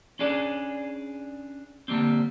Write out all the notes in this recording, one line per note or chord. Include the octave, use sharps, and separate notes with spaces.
C#4 D4 G#4 D5
D3 G3 A#3 C4